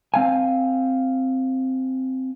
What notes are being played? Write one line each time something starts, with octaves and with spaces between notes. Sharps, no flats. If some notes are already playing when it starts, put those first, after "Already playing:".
C4 F5 G#5